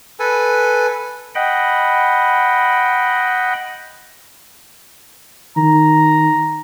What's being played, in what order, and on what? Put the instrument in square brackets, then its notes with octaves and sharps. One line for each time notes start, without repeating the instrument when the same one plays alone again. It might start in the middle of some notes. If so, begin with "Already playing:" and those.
[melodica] A4 B4 G#5
[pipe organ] D#5 F#5 G5 B5
[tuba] D#3 [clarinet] A#5